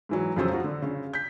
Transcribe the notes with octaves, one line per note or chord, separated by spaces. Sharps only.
G#2 E3 F#3
F2 C#3 F#3 F4 C5 E6
F3 F#4
D3
C#3
G6 B6